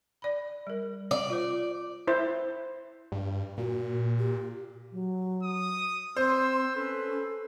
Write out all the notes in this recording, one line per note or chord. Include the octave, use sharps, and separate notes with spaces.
D5 B5
G3 A#4
D5
F4 C5
E4 C5
G2
A#2 F#4
G4
F#3
D#6
C4 C5 C6 E6
C#4 A4 B4